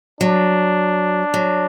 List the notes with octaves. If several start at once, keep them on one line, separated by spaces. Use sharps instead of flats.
F#3 D4
F#3